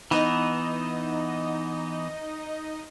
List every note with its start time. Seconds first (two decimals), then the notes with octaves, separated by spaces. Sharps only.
0.11 E3 B3 D#4 D#5